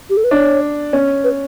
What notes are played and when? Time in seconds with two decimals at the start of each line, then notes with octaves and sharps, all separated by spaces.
0.10 G4
0.17 A4
0.24 B4
0.31 D4 C#5
0.93 C#4
1.24 B4